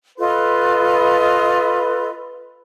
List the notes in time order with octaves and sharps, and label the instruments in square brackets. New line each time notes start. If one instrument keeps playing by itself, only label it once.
[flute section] F4 A4 D#5 [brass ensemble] B4